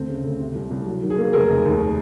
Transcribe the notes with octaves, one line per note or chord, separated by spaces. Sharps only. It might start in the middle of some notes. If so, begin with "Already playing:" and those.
Already playing: D2 C4
C#3
D2
C3
C2
C2
F#3
D#3
G#4
A#3
F1 G#4 A#4
F1
D#2